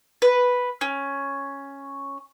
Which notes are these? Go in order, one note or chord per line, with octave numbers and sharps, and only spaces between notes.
B4
C#4